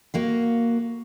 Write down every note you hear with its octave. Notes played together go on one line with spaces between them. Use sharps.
A#3 F#4 F5